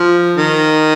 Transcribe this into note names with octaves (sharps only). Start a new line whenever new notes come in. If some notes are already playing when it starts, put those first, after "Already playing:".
Already playing: F3
D#3